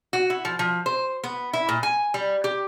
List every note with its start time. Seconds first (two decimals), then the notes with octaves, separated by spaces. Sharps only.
0.13 F#4
0.30 E4
0.45 F3
0.59 F3
0.86 C5
1.24 B3
1.53 E4
1.69 A#2
1.83 G#5
2.14 G3
2.44 G4